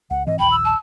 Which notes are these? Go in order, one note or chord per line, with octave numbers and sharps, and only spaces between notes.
C#2 F#5
G#2 E3 C4 D#5
A#1 D#2 G5 B5
E6
A5